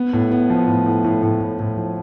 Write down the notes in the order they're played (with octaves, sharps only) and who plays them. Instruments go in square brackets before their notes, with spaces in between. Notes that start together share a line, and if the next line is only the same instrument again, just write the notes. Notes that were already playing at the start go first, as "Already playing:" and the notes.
Already playing: [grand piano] B3
A2
B3
F3
A2
A2
A2
A2
A2
A2
F3